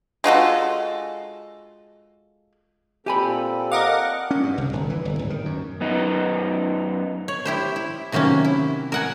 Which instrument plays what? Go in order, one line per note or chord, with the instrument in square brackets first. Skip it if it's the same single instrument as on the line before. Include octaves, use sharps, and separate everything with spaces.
[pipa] G#3 F4 F#4 A4
[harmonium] A#2 C4 A4 [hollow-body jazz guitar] G4 G#5 B5
[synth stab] A#4 D#5 D6 [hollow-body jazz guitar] F5 [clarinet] F#5
[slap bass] C#4
G2
C2
G1
E3
G1
D1
D#3
F#2
[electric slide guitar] F#2 B3 D#4
[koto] C#5
E4 G4 C5
E4
C3 D#3 F#3 A#3 C#4
E4
A#4 F#5 G#5